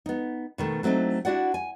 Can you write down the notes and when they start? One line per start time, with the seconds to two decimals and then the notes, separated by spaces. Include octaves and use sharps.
0.06 B3 D#4
0.58 B2 D#3 A3
0.83 F#3 A3 C4 D4 D#4
1.25 D4 E4 F#4 D5 F#5
1.54 G#5